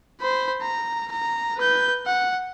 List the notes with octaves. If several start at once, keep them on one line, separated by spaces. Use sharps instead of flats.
C5 B5
A#5
A#5
B4 G6
F#5